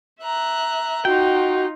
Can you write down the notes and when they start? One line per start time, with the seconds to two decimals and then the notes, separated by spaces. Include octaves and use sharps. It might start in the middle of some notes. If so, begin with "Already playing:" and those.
0.20 E5 A#5 F#6
1.05 D#4 F4 F#4 G5